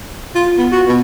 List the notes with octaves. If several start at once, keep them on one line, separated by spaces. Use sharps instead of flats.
F4
B3
F#4
B2